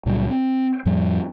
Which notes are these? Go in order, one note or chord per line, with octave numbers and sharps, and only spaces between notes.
C#2 A#2 F#3 G3
C4
F2 A2 F3 G3